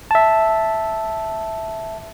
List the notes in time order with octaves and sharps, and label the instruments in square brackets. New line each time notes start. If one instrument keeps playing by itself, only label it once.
[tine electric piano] E5 A5